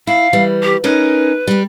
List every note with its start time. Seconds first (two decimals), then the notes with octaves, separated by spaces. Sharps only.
0.07 E4 F5
0.33 E3 G3
0.63 G4
0.84 C#4 D#4 A#4 B4
1.48 G3 G4